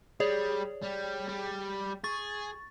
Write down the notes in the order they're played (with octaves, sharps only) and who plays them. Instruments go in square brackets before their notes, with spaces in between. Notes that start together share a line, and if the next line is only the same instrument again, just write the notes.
[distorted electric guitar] G3 [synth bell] G#4 C#5 D5
[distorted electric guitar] G3
G3
[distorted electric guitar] G#4 [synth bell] C#6 A6